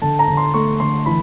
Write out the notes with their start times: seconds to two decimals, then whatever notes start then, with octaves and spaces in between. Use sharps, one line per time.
0.02 D3 A5
0.19 A#5
0.28 D3
0.37 C6
0.54 A3 C#6
0.80 D3 C6
1.06 E3 B5